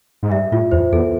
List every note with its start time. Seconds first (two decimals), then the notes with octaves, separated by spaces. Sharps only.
0.23 G#2
0.31 G2 E5
0.52 A2 F4
0.71 E2 C5
0.92 E2 A4